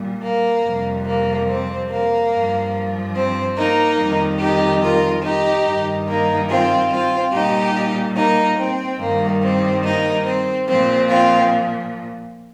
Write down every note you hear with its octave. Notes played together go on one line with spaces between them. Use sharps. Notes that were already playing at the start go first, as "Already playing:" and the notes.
Already playing: A#2 G3
A#3
F2 C3 G3
A#3
C4
A#3
G2 F3
C4
A#3 D#4
F2 D#3 G3
D#4 G4
F4 A#4
D#4 G4
G2 D#3 G3
A#3 D#4
C4 F4
C4 F4
A#2 G3 D#4 G4
A#3 D#4
C4
G2 D#3 G3 A#3
C4
A#3 D#4
C4
A#2 F3 C4
C4 F4